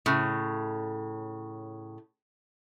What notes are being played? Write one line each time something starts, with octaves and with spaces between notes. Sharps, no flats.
A2 C#3